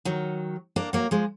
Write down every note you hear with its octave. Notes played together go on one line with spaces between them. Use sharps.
D#3 F#3
A#3 D4
F#3 A#3
F3 G#3